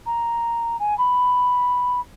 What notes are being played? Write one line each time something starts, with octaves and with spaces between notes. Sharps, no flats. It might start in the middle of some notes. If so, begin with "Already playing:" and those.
A#5
G#5
B5